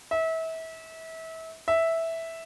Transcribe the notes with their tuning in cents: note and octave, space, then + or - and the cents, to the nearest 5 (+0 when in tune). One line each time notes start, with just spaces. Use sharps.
E5 -30
E5 -5